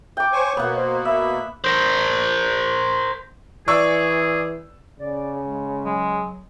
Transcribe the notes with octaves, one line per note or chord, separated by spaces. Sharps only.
G5 D6
C5 C#5 G#5 C#6
B2 A#3 B3 F#5
C5
E5 B5
A#4 C5
E3 G#4 D5 C#6 E6
C#3 D5
G#3
F#3 G#3